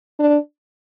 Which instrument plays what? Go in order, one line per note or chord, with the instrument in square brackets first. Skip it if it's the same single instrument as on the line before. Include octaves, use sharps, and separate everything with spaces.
[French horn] D4